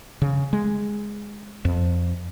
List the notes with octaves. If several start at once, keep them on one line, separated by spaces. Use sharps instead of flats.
C#3
G#3
F2